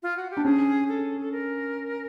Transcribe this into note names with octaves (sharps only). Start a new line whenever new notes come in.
F4
F#4
G4
D4
C#4 G#4
A4
A4
A#4